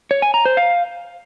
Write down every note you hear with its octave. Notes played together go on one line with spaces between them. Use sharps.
C#5
G#5
A#5
C5
F5